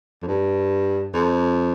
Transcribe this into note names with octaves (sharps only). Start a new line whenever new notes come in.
F2
G2
F2